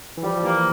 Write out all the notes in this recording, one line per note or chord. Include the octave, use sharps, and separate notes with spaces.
E3
F3 G3
F3
E3 A#3